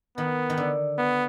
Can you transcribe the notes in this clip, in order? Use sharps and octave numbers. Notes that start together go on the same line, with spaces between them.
D#3 B3
D#3
D3
B3